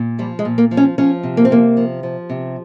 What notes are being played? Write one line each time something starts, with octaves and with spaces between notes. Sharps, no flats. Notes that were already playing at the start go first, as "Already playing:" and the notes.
Already playing: A#2
F3 G3
G#3
A#2
A#3
F3
C#4
F3 C#4
C3
A#3
C4
C3 A#3
F3
F3
C3